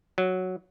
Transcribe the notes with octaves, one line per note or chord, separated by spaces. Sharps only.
F#3